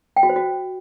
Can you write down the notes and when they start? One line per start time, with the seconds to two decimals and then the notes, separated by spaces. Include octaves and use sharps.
0.17 G5
0.23 F#4
0.29 C5
0.36 F#4